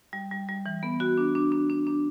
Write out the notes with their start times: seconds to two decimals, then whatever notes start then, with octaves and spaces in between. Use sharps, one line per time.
0.13 G3
0.31 G3
0.48 G3
0.66 E3
0.83 B3
1.00 F#4
1.17 D4
1.35 D4
1.52 D4
1.70 D4
1.87 D4